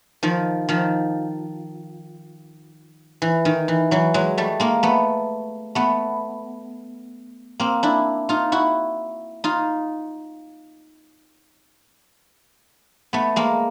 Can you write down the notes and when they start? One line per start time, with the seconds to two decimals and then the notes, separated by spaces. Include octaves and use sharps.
0.23 D#3 F3
0.69 D#3 F3
3.22 E3
3.45 D#3
3.68 E3
3.91 E3 F#3
4.14 F#3 G#3
4.37 G3 A3
4.60 G#3 A#3
4.83 A3 B3
5.75 A3 B3
7.60 A#3 C4
7.83 D4 E4
8.29 D#4 F4
8.52 E4 F#4
9.44 D#4 F4
13.13 A3 B3
13.36 G#3 A#3